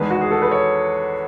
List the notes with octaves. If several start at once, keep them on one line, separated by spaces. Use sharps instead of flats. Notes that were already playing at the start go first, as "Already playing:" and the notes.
Already playing: E2 D#3 G#3 B4
F#4
G#4
A4
B4
C#5